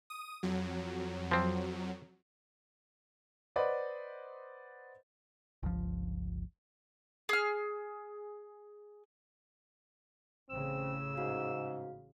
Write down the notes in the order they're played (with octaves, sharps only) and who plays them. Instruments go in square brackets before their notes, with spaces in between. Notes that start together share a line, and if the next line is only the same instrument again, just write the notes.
[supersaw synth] D#6
F2 F#3
[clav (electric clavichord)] F3 C4
[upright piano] B4 C5 D5 D#5 F#5 B5
[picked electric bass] G1 C#2 F3
[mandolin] G#4 F6
[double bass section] A1 C#3 [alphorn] C4 [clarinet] E6
[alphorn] G#2 [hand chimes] F#4 F5